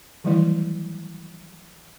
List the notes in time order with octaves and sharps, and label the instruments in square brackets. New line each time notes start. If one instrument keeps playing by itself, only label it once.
[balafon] D#3 E3 F#3 G3 A3 E4